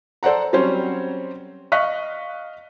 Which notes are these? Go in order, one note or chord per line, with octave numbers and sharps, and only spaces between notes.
A4 C5 D5 F#5 A#5
F#3 G3 C4 C#4 C5 C#5
D#5 F5 C#6 F#6 B6